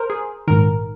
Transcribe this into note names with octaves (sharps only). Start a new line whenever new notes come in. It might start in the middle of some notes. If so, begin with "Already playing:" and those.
Already playing: A#4 C5
G#4
A#1 G#2 D#3 A#4